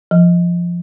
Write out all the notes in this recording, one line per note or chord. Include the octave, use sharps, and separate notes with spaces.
F3